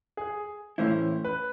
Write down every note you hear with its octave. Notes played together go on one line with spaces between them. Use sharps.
G#4
A2 E3 A3 C#4 E4 C5
B4